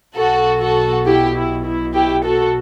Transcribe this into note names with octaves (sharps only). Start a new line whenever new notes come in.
B1 B2 F#4 A4
F#4 A4
E4 G4
E4
E4
E4 G4
F#4 A4